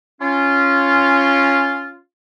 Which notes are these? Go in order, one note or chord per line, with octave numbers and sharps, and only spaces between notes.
C#4 F4